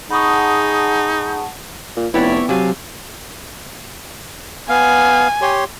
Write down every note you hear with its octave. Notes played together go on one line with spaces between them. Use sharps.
D#4 G#4 F#5 A5 B5 C#6 D#6
A#2
F1 B3 E4 C#5 D5 E5 G5
C3 F#3 F5 G#5 A5
B3 F5 G#5
G4 C#5 C6